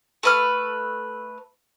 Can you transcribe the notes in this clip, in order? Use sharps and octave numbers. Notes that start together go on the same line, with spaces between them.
A3 B4 F6